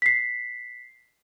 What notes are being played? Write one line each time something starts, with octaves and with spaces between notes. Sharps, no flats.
B6 C7